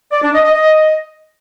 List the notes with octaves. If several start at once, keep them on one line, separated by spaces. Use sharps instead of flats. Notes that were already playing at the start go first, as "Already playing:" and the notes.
D5
D4
D#5
D#5
D#5